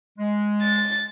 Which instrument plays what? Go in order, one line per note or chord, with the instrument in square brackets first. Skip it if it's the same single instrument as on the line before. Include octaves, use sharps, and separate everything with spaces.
[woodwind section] G#3
[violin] A6